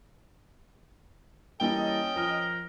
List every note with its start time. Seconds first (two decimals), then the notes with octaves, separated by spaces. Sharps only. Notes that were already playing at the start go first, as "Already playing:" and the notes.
1.61 E3 G3 A#3 C#4 A4 D#5 G5
2.16 F3 A#4 G7